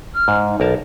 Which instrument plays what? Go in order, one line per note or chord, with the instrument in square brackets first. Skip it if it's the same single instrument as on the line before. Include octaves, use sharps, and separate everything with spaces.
[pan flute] F6
[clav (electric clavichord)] G#2
[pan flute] D#4
[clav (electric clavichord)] B1 A#4 A5